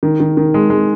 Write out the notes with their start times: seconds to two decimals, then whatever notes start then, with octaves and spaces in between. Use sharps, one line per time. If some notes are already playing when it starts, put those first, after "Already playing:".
0.03 D#3
0.20 D#3
0.37 D#3
0.54 G#3
0.70 G#3